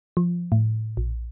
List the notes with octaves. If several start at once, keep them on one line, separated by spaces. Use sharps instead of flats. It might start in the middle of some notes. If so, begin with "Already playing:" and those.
F3
A2
A#1